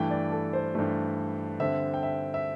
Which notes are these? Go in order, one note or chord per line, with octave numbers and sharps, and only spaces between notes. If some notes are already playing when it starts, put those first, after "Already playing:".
Already playing: G2 E3 A3 G5
D5
A4
C5
G2 E3 A3
G2 D3 C4 E5
G5
E5
E5